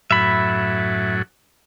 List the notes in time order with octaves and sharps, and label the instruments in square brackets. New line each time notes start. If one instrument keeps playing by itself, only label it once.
[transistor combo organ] F#2 A2 F#3 [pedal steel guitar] E5 B5